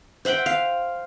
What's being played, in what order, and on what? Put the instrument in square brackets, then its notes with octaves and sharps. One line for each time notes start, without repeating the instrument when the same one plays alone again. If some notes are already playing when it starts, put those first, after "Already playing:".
[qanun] C5 E5 F#5 G5
F5